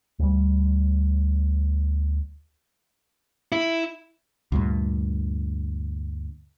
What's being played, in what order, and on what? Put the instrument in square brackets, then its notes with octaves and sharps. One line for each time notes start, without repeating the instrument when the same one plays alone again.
[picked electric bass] D2 G3
[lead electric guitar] E4
[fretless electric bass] D2 G2 A#2